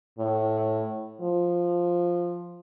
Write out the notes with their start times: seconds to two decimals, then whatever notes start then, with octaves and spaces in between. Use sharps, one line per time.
0.19 A2
1.22 F3